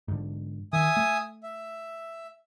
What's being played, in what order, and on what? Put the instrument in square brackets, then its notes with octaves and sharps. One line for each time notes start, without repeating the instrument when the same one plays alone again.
[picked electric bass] G#2 D3
[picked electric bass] D#3 [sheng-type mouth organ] E5 G#5 D#6
[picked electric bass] A3
[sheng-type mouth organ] E5